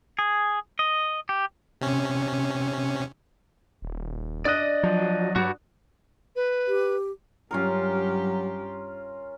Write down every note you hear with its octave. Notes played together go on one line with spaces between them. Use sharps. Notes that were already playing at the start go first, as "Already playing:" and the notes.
G#4
D#5
G4
C3 C#4
D#1
D4 D5 D#5 D#6 F#6
F3 F#3
G2 F#4
B4
G4
G2 F#3 C#4 F4 G4 A#4